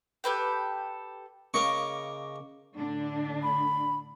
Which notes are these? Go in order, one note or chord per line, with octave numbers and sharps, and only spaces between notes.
G4 A4 B4 G5
C#3 A#3 D#5 C#6 D6
A2 D3 D4
B5